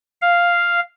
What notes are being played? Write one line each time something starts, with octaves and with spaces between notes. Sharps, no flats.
F5